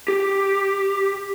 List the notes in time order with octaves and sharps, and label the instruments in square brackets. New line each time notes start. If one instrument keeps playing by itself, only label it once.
[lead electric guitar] G4